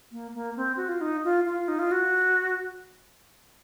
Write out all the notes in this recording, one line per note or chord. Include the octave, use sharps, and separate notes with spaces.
A#3
A#3
C4
F#4
F4
D#4
F4
F4
D#4
F4
F#4